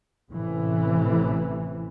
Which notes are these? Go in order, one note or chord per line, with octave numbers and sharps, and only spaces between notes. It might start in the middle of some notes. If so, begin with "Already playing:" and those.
A1 A2 C3 E3